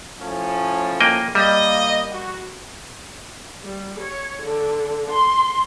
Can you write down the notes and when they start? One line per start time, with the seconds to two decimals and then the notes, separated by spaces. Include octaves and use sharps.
0.19 A2 F3 C#4
1.01 A#3 D#5 G5
1.35 G3 A#3 D#5
2.12 F#4
3.63 G3
4.00 C#5
4.43 D3
5.10 C6